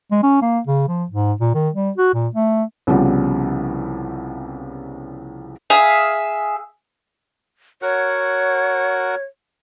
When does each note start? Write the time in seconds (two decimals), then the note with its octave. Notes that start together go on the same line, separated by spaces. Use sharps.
0.11 G#3
0.23 C#4
0.42 A#3
0.67 C#3
0.88 F3
1.10 G#2
1.40 A#2
1.55 D#3
1.75 G3
1.98 F#4
2.14 A#2
2.35 A3
2.87 C2 C#3 F3 G3 B3
5.70 G#4 E5 F5
7.82 F#4 A#4 C#5 F#5